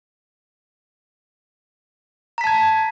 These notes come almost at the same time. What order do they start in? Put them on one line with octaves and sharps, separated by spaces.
A#5 B6 A5 G#6